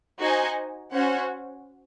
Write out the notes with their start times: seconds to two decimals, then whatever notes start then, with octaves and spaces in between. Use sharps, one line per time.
0.18 D#4 F#4 C5 D#5 G#5
0.92 C#4 F#4 C5 F#5